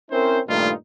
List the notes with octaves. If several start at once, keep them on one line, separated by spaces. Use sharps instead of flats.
C4 C#4 E4 A#4 C5
G2 A#2 D#3 A3 D#4 F4